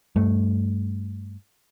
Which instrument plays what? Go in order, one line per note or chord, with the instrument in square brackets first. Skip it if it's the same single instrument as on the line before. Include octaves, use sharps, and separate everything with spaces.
[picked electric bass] G2 A3